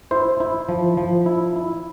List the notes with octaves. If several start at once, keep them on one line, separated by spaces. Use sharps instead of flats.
E4 C5
E4
F3
F3
E4
E4